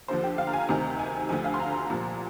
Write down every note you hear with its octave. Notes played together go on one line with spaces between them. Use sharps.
D#2 D3 F3 C5
G4
F5
A#5
G#5
D2 C3 D#3 A#5
G#5
D2 D3 F3 G#5
F5
C6
A#5
C2 A#2 F3 A#5